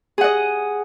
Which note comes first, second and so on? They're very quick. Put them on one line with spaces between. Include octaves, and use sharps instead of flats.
G#4 F#5 D#5